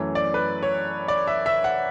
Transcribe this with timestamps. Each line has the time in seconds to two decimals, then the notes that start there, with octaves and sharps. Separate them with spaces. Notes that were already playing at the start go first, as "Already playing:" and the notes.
Already playing: F#2 E3 A3 C#4
0.15 D5
0.34 B4
0.63 C#5
1.08 D5
1.27 E5
1.46 E5
1.64 F#5